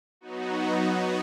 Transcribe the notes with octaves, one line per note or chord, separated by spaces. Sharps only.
F#3 B3 D#4 F#4